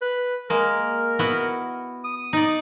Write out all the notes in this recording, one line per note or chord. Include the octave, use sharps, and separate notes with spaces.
B4
G#3 A#3 A#4
B3 E4 F#4
D#6
D#4 D5